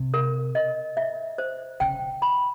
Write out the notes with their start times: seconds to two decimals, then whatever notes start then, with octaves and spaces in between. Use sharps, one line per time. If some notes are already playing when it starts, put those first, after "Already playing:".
Already playing: C3
0.14 A#4
0.55 D#5
0.97 E5
1.38 C5
1.80 C#3 G5
2.22 B5